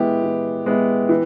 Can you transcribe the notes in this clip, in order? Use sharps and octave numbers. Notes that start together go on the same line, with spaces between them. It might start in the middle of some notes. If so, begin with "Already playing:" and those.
Already playing: E3 G#3 B3 E4 G4
E3
G#3 B3 E4
E3